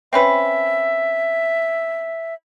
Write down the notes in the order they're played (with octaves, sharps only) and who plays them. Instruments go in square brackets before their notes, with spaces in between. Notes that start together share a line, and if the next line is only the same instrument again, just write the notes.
[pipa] C4 C#4 B4 [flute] E5